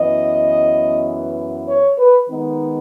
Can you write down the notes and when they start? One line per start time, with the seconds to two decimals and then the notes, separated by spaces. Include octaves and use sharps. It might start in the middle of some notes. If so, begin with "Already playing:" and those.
Already playing: F#2 E3 B3 D#5
1.68 C#5
1.98 B4
2.29 D#3 G#3 B3 D#4